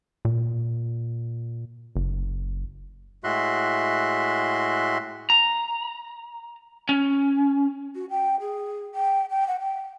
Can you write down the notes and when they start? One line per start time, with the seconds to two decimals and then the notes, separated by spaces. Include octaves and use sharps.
0.25 A#2
1.96 F#1
3.24 A2 G#3 F#4 E5 C6 F#6
5.30 A#5
6.89 C#4
7.95 F#4
8.10 G5
8.40 G#4
8.95 G5
9.30 G5
9.48 F#5
9.60 G5